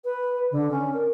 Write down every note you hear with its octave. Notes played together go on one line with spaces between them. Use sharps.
B4
D3
C#4
A#4